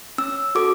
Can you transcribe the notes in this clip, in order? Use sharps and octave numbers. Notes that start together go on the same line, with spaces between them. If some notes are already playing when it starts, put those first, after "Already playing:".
C#4 E6
F#4 A4 D6